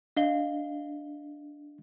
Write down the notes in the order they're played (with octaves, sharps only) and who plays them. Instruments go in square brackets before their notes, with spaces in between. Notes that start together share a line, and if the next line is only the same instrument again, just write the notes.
[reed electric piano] D4 [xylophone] D#5 F5 G7